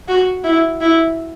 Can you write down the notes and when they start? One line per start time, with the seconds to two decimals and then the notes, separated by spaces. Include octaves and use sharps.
0.08 F#4
0.44 E4
0.81 E4